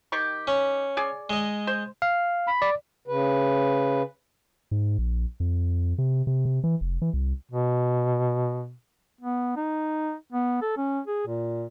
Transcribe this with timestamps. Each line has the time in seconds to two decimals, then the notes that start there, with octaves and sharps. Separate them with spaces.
0.12 D#3 G4 C#6
0.47 C#4
0.97 G#4 D5
1.30 G#3 D#5
1.67 C5
2.02 F5
2.47 B5
2.62 D5
3.08 C#3 B4
4.71 G#2
4.98 A#1
5.40 F2
5.98 C3
6.27 C3
6.45 C3
6.64 E3
6.81 F1
7.02 E3
7.13 C2
7.52 B2
9.21 B3
9.57 D#4
10.33 B3
10.62 A4
10.77 C#4
11.07 G#4
11.27 A#2